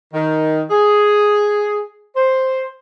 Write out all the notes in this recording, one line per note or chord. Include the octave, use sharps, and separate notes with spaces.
D#3
G#4
C5